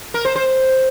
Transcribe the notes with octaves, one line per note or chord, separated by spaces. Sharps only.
A#4
C5
C5